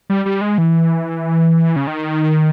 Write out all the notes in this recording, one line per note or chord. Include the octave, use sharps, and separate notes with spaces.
G3
G3
G#3
E3
C#3
D#3